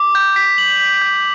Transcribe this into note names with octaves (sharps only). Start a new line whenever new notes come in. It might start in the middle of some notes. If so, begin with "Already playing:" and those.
Already playing: D6
G6
B6
F#7
B6
G6